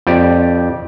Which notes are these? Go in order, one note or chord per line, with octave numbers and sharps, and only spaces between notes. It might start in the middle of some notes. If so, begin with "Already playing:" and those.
F2 G4 D5